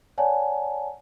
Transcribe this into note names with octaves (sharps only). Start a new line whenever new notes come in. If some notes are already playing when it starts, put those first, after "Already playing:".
C#5 D5 F#5 G#5 A5